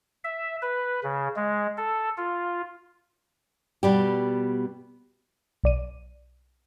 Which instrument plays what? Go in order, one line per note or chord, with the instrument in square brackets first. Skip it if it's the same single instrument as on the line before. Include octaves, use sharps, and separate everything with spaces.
[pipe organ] E5
B4
C#3
G#3
A4
F4
[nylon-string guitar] B2 G3 G4
[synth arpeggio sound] B1 D5 D#7